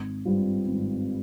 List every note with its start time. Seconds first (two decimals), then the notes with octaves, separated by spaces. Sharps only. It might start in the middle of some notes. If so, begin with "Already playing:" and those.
Already playing: G#1
0.25 G2 G3 C4 F4
0.67 G#1